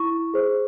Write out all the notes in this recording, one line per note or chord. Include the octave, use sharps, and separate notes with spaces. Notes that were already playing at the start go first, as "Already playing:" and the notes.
Already playing: E4 C#6
G#4 C5